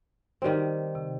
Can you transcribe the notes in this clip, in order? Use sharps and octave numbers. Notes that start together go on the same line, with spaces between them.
D#3 G3 C4
C3